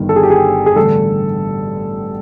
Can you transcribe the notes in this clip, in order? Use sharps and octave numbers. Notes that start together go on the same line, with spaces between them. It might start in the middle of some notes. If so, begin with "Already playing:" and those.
Already playing: G1 G2 D#3
A4
G#4
G4
G#4
G#4
A1 G2 D3 A4